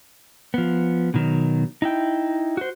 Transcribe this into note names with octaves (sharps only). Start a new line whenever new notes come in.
F3 B3
B2 D#3 F#3
D#4 E4 G5
F#4 C5